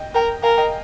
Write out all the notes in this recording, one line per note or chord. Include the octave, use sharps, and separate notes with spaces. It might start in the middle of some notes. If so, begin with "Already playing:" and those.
Already playing: D#5 G5
A#4 G5 A#5
A#4 F5 G#5
D#5 G5